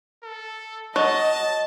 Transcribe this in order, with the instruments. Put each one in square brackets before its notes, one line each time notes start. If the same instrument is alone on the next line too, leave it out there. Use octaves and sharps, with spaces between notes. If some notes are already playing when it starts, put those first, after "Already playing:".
[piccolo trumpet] A4
[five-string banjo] F#3 [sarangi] D#5 [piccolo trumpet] A5